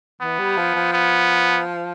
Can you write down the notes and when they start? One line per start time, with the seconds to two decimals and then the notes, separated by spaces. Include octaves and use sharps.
0.21 E3 B3
0.39 G3
0.57 F3
0.75 F3
0.93 B3